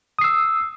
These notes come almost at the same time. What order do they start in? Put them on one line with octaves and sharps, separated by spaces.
D#6 C7 E6